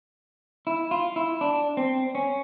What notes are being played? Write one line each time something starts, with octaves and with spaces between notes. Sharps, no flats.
E4
F4
E4
D4
C4
C#4